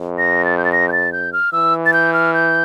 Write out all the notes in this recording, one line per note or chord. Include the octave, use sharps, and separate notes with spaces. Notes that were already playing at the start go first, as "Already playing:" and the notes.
Already playing: F2
A#6
A6
G6
A6
A#6
G6
A6
G6
F6
E3 E6
A6
G6
F6
G6